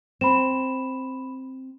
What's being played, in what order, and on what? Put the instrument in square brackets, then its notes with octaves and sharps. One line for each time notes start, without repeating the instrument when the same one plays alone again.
[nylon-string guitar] C4 [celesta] B5 E7